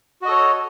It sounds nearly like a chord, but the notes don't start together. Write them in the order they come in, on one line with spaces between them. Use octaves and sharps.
F#4 D#5 A4 C#5